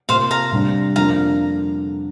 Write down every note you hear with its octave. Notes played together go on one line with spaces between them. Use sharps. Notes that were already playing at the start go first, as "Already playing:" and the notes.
C3 A#3 F4 C5 F5
F5 A#5
C3 G3 D4 G4
F2 D3 A#3 D4 F5 A#5